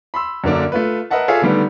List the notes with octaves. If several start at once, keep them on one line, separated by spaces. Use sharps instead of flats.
B5 C6 E6
F#2 D3 A#3 D4
A3 F4 B4
A#4 B4 D#5 E5 F#5 A5
F4 G#4 A4 C#5 E5 F5
D3 D#3 G3 A3 B3